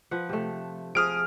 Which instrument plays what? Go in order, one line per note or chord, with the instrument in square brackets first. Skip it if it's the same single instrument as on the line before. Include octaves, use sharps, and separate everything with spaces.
[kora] F3 B4 F#5
C3 A3
[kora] F3 G#4 [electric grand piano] D#6 F6 D7